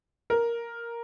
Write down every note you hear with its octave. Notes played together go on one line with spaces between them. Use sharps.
A#4